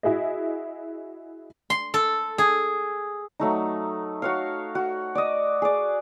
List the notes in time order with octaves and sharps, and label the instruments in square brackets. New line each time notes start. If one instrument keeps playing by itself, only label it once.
[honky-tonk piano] E4 F#4 G#4 D#5
[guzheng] C6
A4
G#4
[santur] F#3 A3 D#4
F#4 C#5 F5
F#4
D5 D#5
G#4 D5